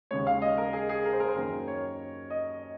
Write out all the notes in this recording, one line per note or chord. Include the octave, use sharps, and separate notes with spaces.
D#2 C#3 G#3 C#5
F5
D#5
A#4
G#4
G#4
A#4
C5
A#4
C5
F#2 D#3 A#3 A#4
C#5
D#5